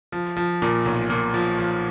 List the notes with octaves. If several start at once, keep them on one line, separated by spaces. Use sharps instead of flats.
F3
F3
A#2
B1
A#2
F3
F3